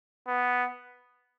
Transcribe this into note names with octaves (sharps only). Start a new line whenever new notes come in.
B3